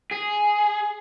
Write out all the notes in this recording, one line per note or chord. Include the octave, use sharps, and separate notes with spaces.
G#4